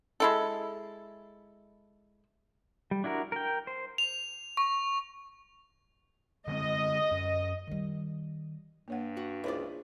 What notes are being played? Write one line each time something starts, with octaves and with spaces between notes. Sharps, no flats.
G#3 E4 A4
G3
D4 E4 F#4 A#4
A#4 G5
C5
F7
C#6
D3 G#3 C4 D#5
F#2
D#3 G3
G2 A#3 C#5 F#5
F#4
C#2 E4 F4 G#4 C5 D5